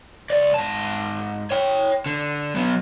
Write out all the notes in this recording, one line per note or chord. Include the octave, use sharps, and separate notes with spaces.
C#2 D5
G#2 A5
C#5 G5
D3
F#3 B3